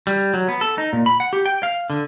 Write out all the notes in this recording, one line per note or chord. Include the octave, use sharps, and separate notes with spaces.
G3
F#3
B3
A4
D#4
A#2
B5
F#5
G4
G5
F5
D3